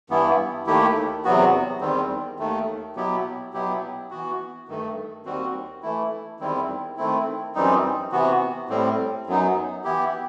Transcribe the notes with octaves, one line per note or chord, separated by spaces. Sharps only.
G2 E3 B3 E4
D#2 D#3 A3 E4 G4
E2 C3 F#3 B3 F#4
E2 D#3 G3 C4
D#2 D#3 A3
B2 F#3 B3 E4 G4
B2 F#3 B3 E4 G4
E3 B3 F#4
G2 D#3 A3
D#2 D#3 G3 C4 F#4
E3 A3 E4
E2 D#3 G3 C4 E4
D#3 A3 C4 E4
F#2 E3 G3 C4 D#4
C3 E3 B3 F#4
A2 G3 C4
F#2 F#3 B3 D#4
E3 B3 E4 G4